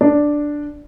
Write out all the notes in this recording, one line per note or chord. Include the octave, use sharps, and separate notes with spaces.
D4